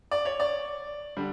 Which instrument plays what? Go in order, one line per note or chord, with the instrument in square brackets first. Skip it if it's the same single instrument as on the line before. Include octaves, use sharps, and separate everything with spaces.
[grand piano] D5
C#5
D5
D3 G3